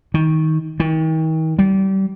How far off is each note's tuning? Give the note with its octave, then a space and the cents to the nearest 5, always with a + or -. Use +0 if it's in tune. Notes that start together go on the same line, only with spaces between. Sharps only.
D#3 +20
D#3 +40
G3 -25